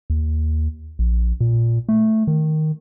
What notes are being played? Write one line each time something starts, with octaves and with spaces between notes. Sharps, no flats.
D#2
A#1
A#2
A3
D#3